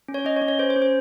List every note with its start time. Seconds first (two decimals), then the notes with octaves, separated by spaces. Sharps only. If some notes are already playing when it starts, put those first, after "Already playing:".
0.08 C#4
0.14 C#5
0.25 C#4 D#5
0.36 C#5
0.42 C#4
0.48 C#5
0.59 C#4 C5
0.70 C5
0.76 C#4
0.82 C5